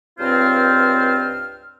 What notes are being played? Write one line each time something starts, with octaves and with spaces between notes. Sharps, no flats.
C#2 G2 C4 F4 C5 F6